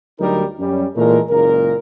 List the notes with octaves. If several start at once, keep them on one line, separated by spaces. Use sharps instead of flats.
D2 F#3 G3 D#4 A#4
F#2 G3 C#4
A#2 E3 G#3 A3 A#4
F#1 C#2 A#2 A#4